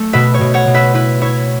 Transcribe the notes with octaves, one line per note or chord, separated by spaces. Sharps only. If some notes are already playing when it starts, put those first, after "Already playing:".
Already playing: A3
B2 B4 E5
C#5
B2
C#5 F#5
B2
B4 E5
E4 B4
E4 C#5